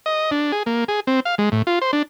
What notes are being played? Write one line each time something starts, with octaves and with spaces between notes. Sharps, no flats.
D#5
D4
G#4
A#3
G#4
C4
F5
G#3
A2
F4
C5
D4